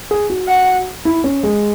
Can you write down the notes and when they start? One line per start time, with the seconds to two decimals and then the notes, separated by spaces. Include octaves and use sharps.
0.11 G#4
0.30 F#4
0.48 F#5
1.05 E4
1.24 C#4
1.43 G#3